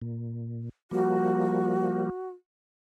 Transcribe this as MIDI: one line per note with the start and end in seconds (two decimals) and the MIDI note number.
0.02 0.69 46
0.91 2.09 53
0.91 2.09 55
0.91 2.09 58
0.91 2.29 66